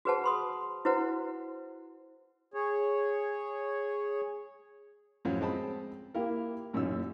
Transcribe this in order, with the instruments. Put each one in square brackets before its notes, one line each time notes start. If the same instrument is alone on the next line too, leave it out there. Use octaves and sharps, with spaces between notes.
[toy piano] F#4 G#4 B4 C5 F#5 A5
B5 C6 D#6
E4 F#4 B4 C5 F#5
[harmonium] G#4 C#5
[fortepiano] F#2 A2 F3 F#3
G#3 C4 D#5 A5 B5
A#3 E4 F4 G4 A#4
A1 F#2 A#2 C#4 D#4 E6